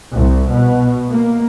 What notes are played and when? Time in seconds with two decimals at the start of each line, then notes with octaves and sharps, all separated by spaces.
0.14 C2
0.51 B2
1.10 A#3